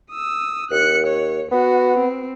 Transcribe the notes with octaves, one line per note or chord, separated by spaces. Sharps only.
D#6 E6
D#2 F#6 C#7
C#5
B3 F#4
C4